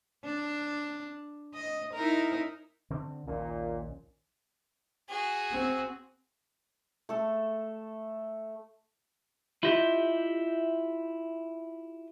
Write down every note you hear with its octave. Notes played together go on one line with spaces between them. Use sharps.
D4
D#5
D#4 E4 A#4
D3 C4
A#1 D#2 A#2 C#4
F#4 G#4
C4
A3 A4
E4 F4 G4 D#5 E5